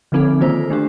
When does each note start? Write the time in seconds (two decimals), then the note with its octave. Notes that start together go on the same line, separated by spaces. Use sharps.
0.12 D3 F3 C4 D#4 A4
0.40 D#3 A#3 F4 C5
0.70 A3 D4 G4